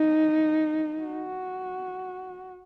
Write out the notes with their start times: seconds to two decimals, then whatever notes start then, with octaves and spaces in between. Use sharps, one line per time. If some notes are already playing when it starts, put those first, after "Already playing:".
Already playing: D#4
1.04 F#4